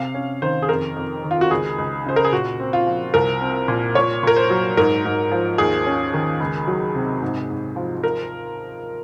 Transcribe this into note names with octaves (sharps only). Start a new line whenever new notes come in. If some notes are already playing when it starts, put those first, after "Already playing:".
Already playing: C3 F5
C#4
D#3 C5
G#4
F2 A#4
F2
D#3
F4
F#4
C#2 G#4
C#2
C#3 C5
A#4
G#4
A#2 F#4
C4
F4
F3
C2 A#4
C4
A#2
A#2 C#5
A#2 A#4
C5
F#3
G#2 A#4
G#2
F3
D#2 G#4
C#4
D#3
C#2
F#3
C3
G#2
G#2
F3
A#4